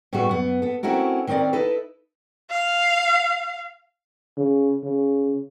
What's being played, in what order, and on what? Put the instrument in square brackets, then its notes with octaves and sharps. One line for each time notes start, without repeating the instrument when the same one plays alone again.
[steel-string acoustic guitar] A2 C#3 G3 A3 B3 F#4
F#2 B3
B3 A4
A3 C4 C#4 E4 F#4 A#4
D#3 C4 C#4 A#4 D5
D#4 E4 A4 B4
[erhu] F5
[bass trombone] C#3
C#3